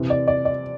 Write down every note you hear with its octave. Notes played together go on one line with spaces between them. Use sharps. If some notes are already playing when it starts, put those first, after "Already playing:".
Already playing: C3 E3
D5
D5
D5